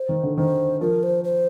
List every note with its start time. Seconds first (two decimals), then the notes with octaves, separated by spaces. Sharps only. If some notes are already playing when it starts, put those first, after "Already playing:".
Already playing: C5
0.09 D#3
0.23 D3
0.37 D#3 C5
0.81 F3 A#4
1.03 C5
1.24 C5